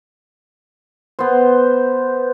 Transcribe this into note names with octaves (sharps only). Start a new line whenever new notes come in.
B3 C5